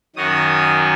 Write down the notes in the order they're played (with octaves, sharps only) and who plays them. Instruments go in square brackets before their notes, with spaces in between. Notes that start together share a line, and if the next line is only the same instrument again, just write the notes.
[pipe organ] F#2 D#3 F#3 C#4 D#6